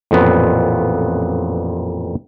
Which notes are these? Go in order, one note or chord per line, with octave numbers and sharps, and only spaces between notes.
A1 F2 A#2 B3